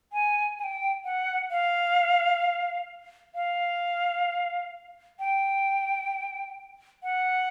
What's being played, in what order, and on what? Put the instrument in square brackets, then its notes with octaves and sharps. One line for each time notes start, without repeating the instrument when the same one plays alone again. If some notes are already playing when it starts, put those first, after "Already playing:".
[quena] G#5
G#5
G5
F#5
F5
F5
G5
F#5